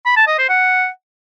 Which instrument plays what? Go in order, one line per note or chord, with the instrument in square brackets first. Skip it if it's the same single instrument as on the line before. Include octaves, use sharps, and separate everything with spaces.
[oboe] B5
A5
D#5
C5
F#5